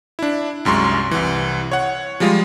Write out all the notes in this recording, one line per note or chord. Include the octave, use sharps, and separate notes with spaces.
D4 E4
C2 F#2 G#3 C6 C#6
C2 E3
C#5 F#5
F3 G3 G#3 F4